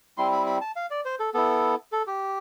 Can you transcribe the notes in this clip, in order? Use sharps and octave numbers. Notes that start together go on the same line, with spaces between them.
G3 C4 E4 C6
B5
B5
A5
F5
D5
C5
A4
B3 E4 A4
A4
G4